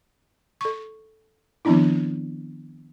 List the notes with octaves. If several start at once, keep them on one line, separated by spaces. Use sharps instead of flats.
A4 C#6
D#3 F3 B3 C4 D4 E4